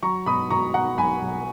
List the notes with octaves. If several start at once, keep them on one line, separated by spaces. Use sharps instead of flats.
F#3 A#5 C#6
B2 B5 D#6
B2 A#5 C#6
B2 F#5 A#5
B1 G#5 B5
B1